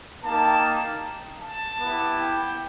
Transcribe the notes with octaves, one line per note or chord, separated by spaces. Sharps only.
A#3 D#4 G4 A5
A5
B3 E4 G4
G5